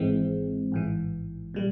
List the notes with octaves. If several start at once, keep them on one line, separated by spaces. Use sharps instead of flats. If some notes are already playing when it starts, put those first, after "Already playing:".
Already playing: G#1 G#2 E3 G#3 C4
A1 G#2 E3
A#2 G3